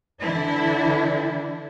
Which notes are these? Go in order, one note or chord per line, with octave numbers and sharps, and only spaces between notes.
D3 E3 D4 E4